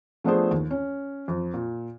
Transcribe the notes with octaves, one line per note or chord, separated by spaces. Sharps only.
F3 A3 B3 D4 G#4 C5
D#2
C#4
F2
A#2